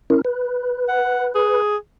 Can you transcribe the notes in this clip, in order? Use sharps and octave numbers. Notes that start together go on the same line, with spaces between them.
C#4 E4 A#4
B4
F#5
G#4